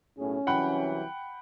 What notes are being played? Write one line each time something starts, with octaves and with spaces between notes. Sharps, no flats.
B1 A2 C#4 G#4
C2 E3 F#3 F#5 G5 B5